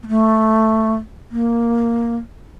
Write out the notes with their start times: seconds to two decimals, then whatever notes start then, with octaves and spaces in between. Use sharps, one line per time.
0.03 A#3
0.08 A3
1.31 A#3